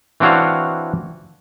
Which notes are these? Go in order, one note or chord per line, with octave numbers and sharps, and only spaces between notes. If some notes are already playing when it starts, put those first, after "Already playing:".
E3 C4 D4 F#4 C#5 F5